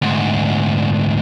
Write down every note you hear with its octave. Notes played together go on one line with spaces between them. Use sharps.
D2 G#2